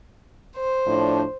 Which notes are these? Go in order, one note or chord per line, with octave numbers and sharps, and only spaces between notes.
C5
A2 F3 D4